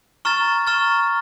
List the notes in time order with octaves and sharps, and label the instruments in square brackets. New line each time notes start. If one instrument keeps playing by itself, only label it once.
[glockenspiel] A#5 C#6 F6 A6
A#5 C#6 F6 A6